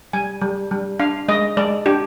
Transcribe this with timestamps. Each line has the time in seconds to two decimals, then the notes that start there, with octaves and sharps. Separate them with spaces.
0.13 G3 G#5
0.41 G3
0.71 G3
0.99 D4 F5
1.28 G#3 D#5
1.57 G#3 D5
1.86 D4 G4